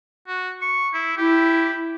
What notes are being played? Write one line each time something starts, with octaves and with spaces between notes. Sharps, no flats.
F#4
C#6
E4
E4 G4